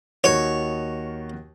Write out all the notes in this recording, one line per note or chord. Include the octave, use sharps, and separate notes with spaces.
D#2 D#3 F#4 C#5